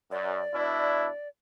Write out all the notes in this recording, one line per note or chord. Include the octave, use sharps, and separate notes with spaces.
F#2 D5
B2 D4 E4